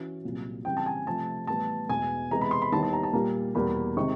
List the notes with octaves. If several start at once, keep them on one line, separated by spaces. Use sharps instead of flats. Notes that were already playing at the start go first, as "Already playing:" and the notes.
Already playing: E3 C#4 F#4
C2 A#2 F#3
C#3 E3 G3 C4 G5
A5
G#5
C3 F3 A3 A5
A2 E3 G3 B3 A5
E2 B2 G#3 B3 G#5
C3 E3 G#3 B3 A#5
B5
C6
B5
D#2 D#3 G3 B3 E4 A5
A5
A#5
A5
A#2 G3 A#3 A#5
E2 B2 G3 A#3 B5
C3 D#3 G#3 C4 C#6